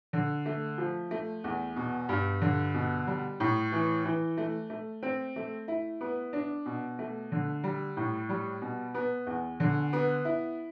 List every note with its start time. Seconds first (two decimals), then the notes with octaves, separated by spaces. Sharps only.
0.13 D3
0.46 A3
0.78 F3
1.11 A3
1.44 E2
1.76 B2
2.09 G2
2.42 D3
2.74 B2
3.07 G3
3.40 A2
3.72 E3
4.05 E3
4.37 A3
4.70 A3
5.03 C4
5.36 A3
5.68 E4
6.01 B3
6.33 D4
6.66 B2
6.99 A3
7.32 D3
7.64 G3
7.97 A2
8.29 G3
8.62 B2
8.95 B3
9.27 E2
9.60 D3
9.93 B3
10.25 E4